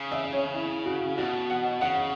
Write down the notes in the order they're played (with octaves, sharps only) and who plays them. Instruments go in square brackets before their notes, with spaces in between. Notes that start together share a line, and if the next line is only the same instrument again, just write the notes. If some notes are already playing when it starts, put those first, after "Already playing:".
Already playing: [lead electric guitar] C#3
[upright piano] E5
C#5
E4
F#4
[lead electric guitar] B2 [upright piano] F#4
[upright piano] F#5
[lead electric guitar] C#3 [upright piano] F#5